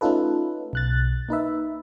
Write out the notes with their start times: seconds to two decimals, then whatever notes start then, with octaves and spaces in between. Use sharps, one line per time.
0.01 A3 C#4 D#4 F4 A4 B4
0.73 B1 F#6 A6
1.29 A#3 D#4 B4 E5